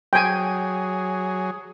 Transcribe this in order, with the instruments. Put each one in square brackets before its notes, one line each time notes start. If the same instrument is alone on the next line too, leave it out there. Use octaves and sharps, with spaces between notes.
[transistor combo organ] F#3 G#4 [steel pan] G5 G#5